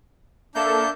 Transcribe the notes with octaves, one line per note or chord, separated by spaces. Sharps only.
A#3 D4 A4 E5 G6